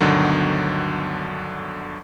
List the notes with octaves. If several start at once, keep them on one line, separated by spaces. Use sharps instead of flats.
G1 D2 B2 D3 D#3 F#3